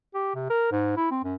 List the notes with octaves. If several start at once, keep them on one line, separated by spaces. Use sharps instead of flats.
G4
C3
A#4
G#2
E4
C4
F#2